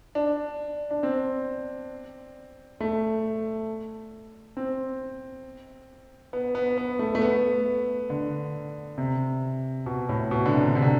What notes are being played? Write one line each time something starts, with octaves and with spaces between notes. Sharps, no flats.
D4
D4
C4
A3
C4
B3
B3
B3
A3
A3
B3
D3
C3
B2
A2
B2
D3
C3
C3
D3